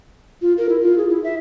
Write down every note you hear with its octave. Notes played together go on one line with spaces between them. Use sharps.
F4
A#4
E4
F4
G#4
E4
E5